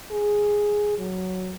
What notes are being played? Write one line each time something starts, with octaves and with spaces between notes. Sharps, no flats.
G#4
F#3